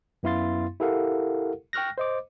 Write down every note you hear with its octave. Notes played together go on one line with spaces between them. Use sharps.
F#2 B3 E4 F5 C6 A6
E4 G4 A4 A#4 F5 F#5
G5 C#6 F6 F#6 A#6
C5 D#5 D6